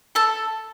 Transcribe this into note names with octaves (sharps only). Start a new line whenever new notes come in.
A4 A5